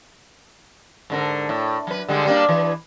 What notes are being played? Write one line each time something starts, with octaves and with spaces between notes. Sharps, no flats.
G#2 D3 A#4
A2
F#3 B4
D3 G3 G#3
G3 A#3 D4
E3 B4